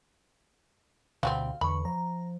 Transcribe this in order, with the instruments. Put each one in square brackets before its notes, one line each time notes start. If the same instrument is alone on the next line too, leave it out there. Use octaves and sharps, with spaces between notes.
[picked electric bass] D2 B2 D3 [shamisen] F#3 G3 C4 [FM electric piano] F5
[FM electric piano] E2 C#6 [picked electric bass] D3 [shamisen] B5
[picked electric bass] F3 [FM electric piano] A#5